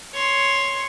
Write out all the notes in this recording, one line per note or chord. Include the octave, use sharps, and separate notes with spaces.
C#5 C6